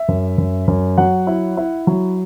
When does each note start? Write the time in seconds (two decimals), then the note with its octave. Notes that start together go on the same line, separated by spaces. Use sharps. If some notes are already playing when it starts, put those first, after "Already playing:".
Already playing: E5
0.08 F#2
0.38 F#2
0.68 F#2
0.98 F#3 F#5
1.27 E4
1.57 E4
1.87 F#3